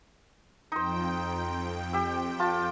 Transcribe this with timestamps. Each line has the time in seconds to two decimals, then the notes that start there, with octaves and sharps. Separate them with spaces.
0.72 F2 D#4 C5 G5
1.93 G4 E6
2.40 F4 A5